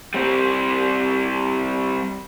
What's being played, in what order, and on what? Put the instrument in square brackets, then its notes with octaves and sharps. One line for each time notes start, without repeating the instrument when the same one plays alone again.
[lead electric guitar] G3 C4